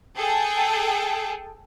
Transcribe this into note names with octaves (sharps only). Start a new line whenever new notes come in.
G#4 A4 G5 A5